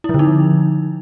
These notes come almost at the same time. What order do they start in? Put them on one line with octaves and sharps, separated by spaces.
E4 F3 D3 D#4